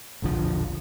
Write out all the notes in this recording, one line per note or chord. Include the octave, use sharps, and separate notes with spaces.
E1 A#1 D3 F3